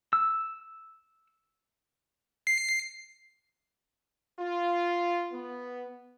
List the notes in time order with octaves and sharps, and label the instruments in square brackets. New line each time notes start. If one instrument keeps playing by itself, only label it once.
[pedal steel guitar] E6
[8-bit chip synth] C7
[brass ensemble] F4
B3